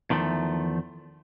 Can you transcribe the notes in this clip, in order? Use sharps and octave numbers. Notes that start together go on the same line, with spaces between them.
E2 D#3 F3 A3